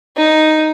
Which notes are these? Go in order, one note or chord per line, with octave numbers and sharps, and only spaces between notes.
D#4